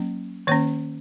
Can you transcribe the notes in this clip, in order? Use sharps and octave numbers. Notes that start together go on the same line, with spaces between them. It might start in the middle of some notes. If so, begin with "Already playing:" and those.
Already playing: F#3 A#3 C#4
D#3 A#3 C#4 C#5